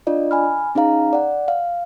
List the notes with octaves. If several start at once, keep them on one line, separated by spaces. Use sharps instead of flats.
D4 F4 D5 D#5
G#5 B5 F6
C#4 D#4 G#4 F5 A#5
D5 F#5
F5